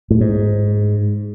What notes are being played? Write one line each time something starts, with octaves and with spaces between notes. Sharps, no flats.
A2
G#2